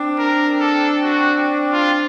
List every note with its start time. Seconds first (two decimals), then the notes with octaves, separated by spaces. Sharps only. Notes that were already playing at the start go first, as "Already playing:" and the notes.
Already playing: C4 D4
0.19 A#4
0.60 A4
1.03 F#4
1.72 F4